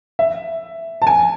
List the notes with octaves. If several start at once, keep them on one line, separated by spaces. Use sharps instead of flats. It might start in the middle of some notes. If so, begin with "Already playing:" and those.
E5
A5
G#5